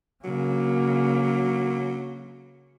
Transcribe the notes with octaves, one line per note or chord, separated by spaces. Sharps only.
C#3 F#3 A#3